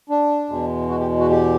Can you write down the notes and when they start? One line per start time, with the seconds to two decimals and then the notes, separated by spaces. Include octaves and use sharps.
0.10 D4
0.50 E2 B2 G#3
0.89 F#4
1.00 G4
1.20 F#4
1.30 G4